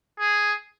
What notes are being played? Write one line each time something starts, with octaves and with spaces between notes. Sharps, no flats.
G#4